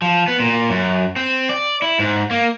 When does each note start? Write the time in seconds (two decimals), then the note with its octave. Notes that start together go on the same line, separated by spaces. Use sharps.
0.02 F3
0.28 B3
0.40 A#2
0.70 F#2
1.16 C4
1.49 D5
1.82 E4
1.99 G#2
2.31 A#3